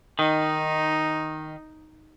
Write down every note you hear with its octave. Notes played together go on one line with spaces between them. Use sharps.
D#3 D#4